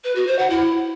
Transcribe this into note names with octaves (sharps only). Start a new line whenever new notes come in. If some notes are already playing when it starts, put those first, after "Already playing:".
B4
F#4
C5
F#5
E4